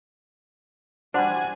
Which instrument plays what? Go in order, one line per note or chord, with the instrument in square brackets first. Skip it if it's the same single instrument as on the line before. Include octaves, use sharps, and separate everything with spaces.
[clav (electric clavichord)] G3 D4 [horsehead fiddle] F#4 G#5 [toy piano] C5 F#5 C6